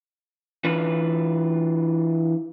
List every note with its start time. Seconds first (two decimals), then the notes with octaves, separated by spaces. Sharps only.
0.64 E3 D4 F4 B4